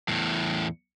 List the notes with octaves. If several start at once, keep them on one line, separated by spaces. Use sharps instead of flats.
E2 A2